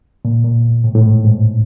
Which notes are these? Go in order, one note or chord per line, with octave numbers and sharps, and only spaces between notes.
A#2
A#2
A2
A2
G#2
G#2